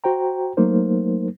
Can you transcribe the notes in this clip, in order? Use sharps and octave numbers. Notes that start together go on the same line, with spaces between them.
F#4 C5 G5 A#5
F#3 A3 A#3 D#4 A#4 C5